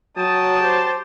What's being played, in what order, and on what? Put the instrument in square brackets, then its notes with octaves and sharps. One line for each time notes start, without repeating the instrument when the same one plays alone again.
[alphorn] F#3 [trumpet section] G5 A5 [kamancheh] D#6
[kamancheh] G4 C5